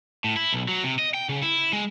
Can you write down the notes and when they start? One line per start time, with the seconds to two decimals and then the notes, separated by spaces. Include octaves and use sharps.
0.24 A2
0.36 E4
0.53 B1
0.68 F#3
0.84 C3
0.99 D#5
1.14 G5
1.29 C#3
1.42 E4
1.73 G#3